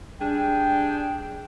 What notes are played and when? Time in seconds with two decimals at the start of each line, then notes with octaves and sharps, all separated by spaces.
0.20 G3 D4 G#4 G5